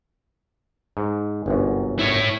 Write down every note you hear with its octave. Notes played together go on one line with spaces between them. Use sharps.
G#2
G1 C2 F#2
E4 C#5